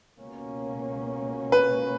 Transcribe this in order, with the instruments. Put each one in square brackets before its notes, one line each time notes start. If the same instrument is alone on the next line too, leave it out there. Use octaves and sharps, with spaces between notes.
[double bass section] C#2 B2 A#3 C#4
[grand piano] B4